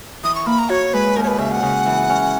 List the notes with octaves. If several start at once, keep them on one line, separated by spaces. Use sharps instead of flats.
E3 D#6
C#6
A#3 B5
A#5
F#4 C#5
G#3 B4
D#2 A#4
C#5
B4
C#3 E5
F#5
C#3
E3
C#4